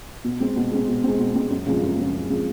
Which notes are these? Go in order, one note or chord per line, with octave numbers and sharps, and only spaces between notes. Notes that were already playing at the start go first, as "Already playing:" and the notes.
B2
G#3 C4
B2
G#3 C4
B2
G#3 C4
B2
G#3 C4
F#2
C#3 F3 G#3 C4
F#2
C#3 F3 G#3 C4
F#2
C#3 F3 G#3 C4